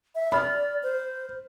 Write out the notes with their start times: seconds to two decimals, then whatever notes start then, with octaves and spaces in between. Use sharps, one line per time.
0.15 E5
0.32 D5 B5 F6
0.83 C5